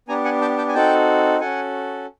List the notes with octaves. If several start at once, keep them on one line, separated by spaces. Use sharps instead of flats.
B3 D4 G4 G#5 A#5
F#5 G#5
G5 A5
G5 A5
G#5
C4 D#4 F#4 A4 G5 A5
C#4 F#4 A4 F#5 G#5